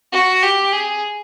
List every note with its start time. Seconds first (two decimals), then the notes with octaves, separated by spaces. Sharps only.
0.13 F#4
0.43 G4
0.73 G#4